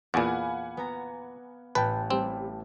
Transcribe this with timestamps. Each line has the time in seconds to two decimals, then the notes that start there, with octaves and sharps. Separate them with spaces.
0.14 E2 A#2 F5 F#5 G#5 B5 D6
0.77 B3 A#5
1.75 A1 B4 G5 A5
2.10 G3 C4